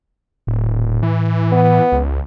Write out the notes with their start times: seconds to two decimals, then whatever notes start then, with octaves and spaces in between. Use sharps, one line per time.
0.47 D#1 A2
1.03 E3
1.52 B3
1.92 C#2